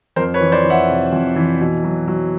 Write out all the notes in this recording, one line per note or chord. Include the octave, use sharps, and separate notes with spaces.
F2 A#4 C5
B4 C#5
E3
C5 D5
E3
E5 F#5
C3
F2
E3
B2
F#3
F#3